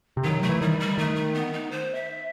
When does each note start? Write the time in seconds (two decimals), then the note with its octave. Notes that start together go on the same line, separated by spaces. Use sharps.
0.17 C3
0.24 D#3 F#3
0.42 A3
0.49 E3
0.61 D#3 G3
0.80 G3
0.98 D#3 A3
1.16 A3
1.34 B3
1.53 D#4
1.71 C5
1.95 E5